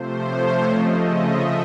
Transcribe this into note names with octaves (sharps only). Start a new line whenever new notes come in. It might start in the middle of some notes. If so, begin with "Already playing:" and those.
Already playing: C3 F3 A3 C5
C#5
C#3 F3 A3 D#5
E5